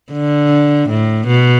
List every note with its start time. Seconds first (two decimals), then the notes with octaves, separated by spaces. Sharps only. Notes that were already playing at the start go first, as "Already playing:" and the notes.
0.12 D3
0.89 A2
1.27 B2